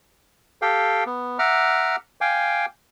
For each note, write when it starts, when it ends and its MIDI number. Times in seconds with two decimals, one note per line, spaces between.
0.62 1.04 67
0.62 1.04 69
0.62 1.04 77
0.62 1.04 79
1.06 1.38 59
1.39 1.96 76
1.39 1.96 78
1.39 1.96 82
1.39 1.96 86
1.39 1.96 89
2.21 2.66 77
2.21 2.66 79
2.21 2.66 80
2.21 2.66 86